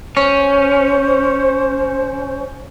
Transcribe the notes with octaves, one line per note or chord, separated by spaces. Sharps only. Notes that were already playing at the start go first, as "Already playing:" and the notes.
C#4 C5